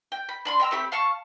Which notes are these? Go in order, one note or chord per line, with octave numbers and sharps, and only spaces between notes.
G5
B5
D4 B5 C6
D#5 G5 A#5 E6
A3 C4 G4 B5
F5 A5 C#6